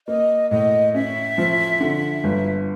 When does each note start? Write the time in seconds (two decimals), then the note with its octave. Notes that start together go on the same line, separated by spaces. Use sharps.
0.08 A#3 D#5
0.50 A2 D#5
0.94 C#4 E5
1.38 F3
1.80 D3
2.24 G1